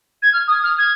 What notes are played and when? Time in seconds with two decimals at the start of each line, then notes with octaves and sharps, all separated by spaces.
0.22 G#6
0.33 F6
0.47 D#6
0.63 F6
0.78 G#6